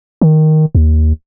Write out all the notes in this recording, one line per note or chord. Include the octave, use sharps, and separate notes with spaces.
D#3
D#2